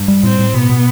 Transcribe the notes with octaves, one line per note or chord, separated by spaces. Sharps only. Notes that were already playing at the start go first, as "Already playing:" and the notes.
Already playing: G2
G3
A2 C4
A2
B2 B3
B2